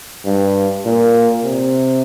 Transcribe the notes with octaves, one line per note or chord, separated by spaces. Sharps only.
G2
A#2
C3